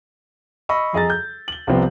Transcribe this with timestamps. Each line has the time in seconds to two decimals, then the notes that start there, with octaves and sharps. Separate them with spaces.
0.69 D#5 B5 C#6 E6
0.93 F2 G#4 D#5 A#5 A6
1.10 G6
1.48 F#7 G7
1.67 C2 C3 F3 B3 C4